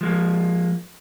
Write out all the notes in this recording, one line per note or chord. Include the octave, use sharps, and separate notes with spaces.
F3 G#3 A#3